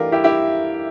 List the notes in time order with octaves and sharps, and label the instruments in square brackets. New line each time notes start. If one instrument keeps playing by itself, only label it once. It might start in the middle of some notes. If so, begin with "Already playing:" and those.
Already playing: [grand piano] E3 A3 D4 F4 G4 A#4
E4 G4
E4 G4